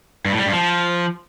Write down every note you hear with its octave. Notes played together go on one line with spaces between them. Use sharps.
G2
A2
G3
G2
F3